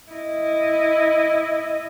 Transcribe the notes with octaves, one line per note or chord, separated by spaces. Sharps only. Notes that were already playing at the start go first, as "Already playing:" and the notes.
E4 D#5